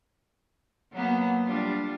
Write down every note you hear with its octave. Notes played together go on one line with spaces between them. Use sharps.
F#3 A#3 B3
G3 D4 F4